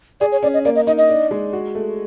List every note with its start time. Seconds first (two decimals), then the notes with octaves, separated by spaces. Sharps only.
0.21 G#4 D5
0.32 C#5
0.43 C#4 D5
0.54 D#5
0.65 A#3 D5
0.76 D#5
0.87 D#4 D#5
0.98 D#5
1.09 D4
1.31 G#3
1.53 F#4
1.75 A3